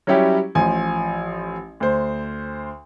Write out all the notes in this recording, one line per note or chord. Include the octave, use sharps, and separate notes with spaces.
F#3 G3 C#4 E4 G4
A1 F3 G#5
D2 C5